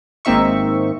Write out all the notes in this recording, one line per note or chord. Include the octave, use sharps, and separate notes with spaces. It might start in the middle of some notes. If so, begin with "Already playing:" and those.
G#1 A#3 C4 D#4 E5 C#6